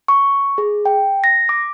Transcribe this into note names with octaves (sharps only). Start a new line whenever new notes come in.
C#6
G#4
G5
A#6
D6